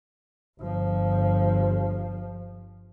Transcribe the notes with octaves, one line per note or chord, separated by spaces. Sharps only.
G1 F3